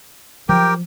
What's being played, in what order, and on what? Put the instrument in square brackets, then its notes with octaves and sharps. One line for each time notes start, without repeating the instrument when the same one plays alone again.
[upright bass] F3 F#3 [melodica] G4 A#4 G5